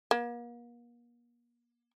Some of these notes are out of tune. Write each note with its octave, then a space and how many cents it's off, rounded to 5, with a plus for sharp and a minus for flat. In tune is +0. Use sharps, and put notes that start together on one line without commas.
A#3 +40